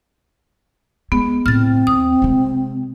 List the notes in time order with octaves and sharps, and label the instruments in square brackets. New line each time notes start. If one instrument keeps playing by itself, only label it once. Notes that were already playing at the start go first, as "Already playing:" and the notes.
[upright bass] G#3 [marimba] B3
[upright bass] A2 C#3 [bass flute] C4 [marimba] F6 A6
[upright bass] D#2 [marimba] D#6
[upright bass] C3 G#3